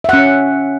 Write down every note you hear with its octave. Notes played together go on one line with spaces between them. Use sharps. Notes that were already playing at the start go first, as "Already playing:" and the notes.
C#4 E5 F#5